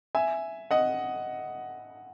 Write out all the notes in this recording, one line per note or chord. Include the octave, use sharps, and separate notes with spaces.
E5 G#5
D#5 F#5